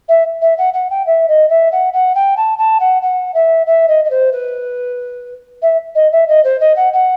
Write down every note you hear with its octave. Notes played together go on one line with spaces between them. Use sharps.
E5
E5
F#5
F#5
G5
E5
D#5
E5
F#5
F#5
G5
A5
A5
F#5
F#5
E5
E5
D#5
D#5
C5
B4
E5
D#5
E5
D#5
C5
D#5
F#5
F#5